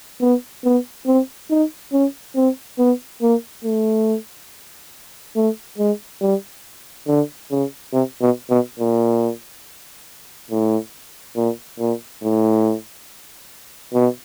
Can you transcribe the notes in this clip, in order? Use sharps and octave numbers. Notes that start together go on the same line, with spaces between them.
B3
B3
C4
D#4
C#4
C4
B3
A#3
A3
A3
G#3
G3
D3
C#3
C3
B2
B2
A#2
A2
A#2
A#2
A2
B2